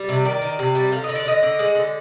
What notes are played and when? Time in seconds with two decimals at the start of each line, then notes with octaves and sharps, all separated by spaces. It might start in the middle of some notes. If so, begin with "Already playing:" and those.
Already playing: G3
0.09 C3
0.25 D#3 D5
0.42 D#3
0.59 C3
0.75 G3
0.92 D3 F5
1.04 D#5
1.09 D3
1.15 D5
1.25 D3 D#5
1.43 D3
1.59 G#3
1.75 D3